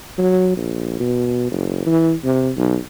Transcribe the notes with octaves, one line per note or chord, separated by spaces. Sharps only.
F#3
A#1
B2
F#1
E3
C3
B1